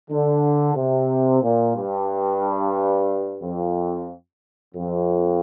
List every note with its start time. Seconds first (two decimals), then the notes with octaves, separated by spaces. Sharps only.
0.11 D3
0.76 C3
1.43 A#2
1.75 G2
3.42 F2
4.75 F2